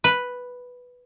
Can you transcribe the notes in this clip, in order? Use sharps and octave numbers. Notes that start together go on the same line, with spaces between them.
B4